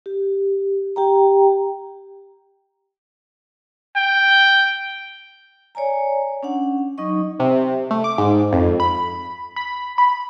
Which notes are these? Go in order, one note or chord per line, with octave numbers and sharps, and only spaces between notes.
G4
G4 G5 A#5
G5
C#5 D5 G#5 A#5
C#4 D4 F#5
F#3 D#4 D#5 C#6
C3
A3
D6
G#2
F2
B5
B5
B5